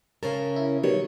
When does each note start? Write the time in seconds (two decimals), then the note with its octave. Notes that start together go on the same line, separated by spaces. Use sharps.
0.23 C#3 C#4 A#4 A5
0.56 E4
0.83 B2 D#3 G3 C#5